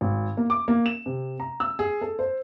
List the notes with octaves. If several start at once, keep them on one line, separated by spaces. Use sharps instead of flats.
G#1
A#3
D6
A#3
E7
C3
A#5
E6
G#4
A4
C5